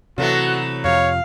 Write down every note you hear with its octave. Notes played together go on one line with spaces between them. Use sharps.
C3 E3 F#3 A3 B3 F#4
F2 C3 F3 C#5 F5